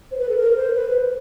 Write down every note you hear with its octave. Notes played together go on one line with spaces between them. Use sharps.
C5
B4
A4
A#4
B4
C5
B4